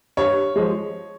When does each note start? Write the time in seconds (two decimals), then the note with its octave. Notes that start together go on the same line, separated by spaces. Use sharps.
0.17 G2 C#5
0.56 F3 G#3